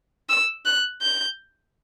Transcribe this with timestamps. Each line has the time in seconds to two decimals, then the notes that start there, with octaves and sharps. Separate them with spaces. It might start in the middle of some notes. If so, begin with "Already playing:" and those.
0.29 E6
0.65 F#6
1.02 G6